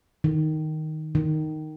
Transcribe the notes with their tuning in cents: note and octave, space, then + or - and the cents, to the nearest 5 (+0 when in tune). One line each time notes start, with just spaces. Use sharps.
D#3 +0
D#3 -5